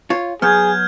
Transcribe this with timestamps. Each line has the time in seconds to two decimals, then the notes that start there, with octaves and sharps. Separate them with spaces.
0.10 F4 C#5
0.42 F#3 B3 G#4 F6 G6 G#6